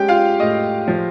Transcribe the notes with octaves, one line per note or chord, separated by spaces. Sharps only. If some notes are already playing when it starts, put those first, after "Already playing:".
Already playing: G#3 C#4 G4 G5
F4 F5
A2 D#5
F3